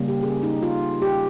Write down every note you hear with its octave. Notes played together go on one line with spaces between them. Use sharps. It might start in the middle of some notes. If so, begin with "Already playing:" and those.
Already playing: C#3 G3 A#3 C#4
G4
G#4
D#4
F4
G4